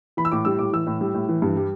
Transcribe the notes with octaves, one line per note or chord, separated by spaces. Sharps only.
E3 B5
E6
A2 D6
G3 E6
A2 D6
E3 E6
A2
G3
A2
E3
G2
G3